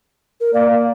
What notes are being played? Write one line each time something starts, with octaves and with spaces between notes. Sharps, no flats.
A#4
A#3 D5
A#3